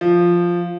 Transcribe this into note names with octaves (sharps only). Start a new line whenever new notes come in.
F3